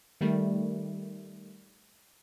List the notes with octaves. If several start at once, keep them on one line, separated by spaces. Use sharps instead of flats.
D#3 G3 A3